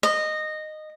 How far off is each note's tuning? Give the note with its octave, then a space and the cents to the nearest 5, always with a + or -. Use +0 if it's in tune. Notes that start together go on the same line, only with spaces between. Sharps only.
D#5 -15